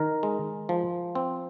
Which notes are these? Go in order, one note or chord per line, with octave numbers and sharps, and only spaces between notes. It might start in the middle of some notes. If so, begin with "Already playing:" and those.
Already playing: D#3 A#4
G#3
F3
C4